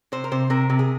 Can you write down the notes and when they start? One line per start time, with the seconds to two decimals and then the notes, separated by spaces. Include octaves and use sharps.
0.12 C3 C5
0.24 A#4
0.31 C3 C5
0.50 C3 A#4
0.70 C3
0.79 G#4